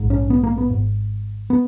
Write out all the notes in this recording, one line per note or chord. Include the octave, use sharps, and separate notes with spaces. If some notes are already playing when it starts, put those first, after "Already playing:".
Already playing: A#1 G#2
C#4
B3
A#3
B3
G#1 G#2
B3